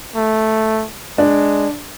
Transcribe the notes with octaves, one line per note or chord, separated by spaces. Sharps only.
A3
G#3 D4